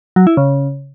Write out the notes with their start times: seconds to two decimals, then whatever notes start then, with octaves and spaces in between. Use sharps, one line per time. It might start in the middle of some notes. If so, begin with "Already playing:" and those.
0.16 F#3
0.27 E4
0.37 C#3